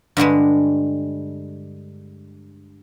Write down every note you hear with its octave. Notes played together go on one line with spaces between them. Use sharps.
G2 D3 G3 G#3